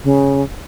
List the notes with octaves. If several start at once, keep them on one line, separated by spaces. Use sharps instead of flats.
C#3